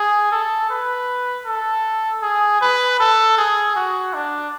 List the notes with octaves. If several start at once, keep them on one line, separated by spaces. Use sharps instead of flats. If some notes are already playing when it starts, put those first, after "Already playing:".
Already playing: G#4
A4
B4
A4
G#4
B4
A4
G#4
F#4
D4